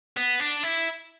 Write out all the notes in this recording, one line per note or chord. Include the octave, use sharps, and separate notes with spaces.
B3
D4
E4